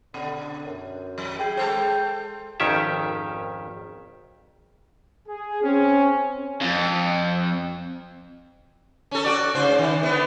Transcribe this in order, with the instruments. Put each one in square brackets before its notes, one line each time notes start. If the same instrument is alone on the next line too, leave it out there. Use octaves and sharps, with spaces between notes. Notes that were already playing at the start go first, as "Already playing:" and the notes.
[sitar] B2 [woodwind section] D3
[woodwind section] F#2
[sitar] F#3
[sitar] G#4 [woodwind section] G5
[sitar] G#3 A4 C5
[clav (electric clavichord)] G#1 F2 D#3 C#4 G4 E5
[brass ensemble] G#4
C4 C#4
[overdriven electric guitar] F2
[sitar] C#4 A4
F#4 D5
G#2 C#3 C5
D#3
D3 B3